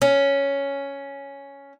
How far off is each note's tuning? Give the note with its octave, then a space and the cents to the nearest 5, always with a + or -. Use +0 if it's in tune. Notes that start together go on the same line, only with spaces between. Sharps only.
C#4 +5